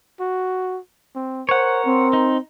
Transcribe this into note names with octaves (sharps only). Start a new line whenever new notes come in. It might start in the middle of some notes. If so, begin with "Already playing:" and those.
F#4
C4
A#4 C5 C#5 F#5
C4
D#4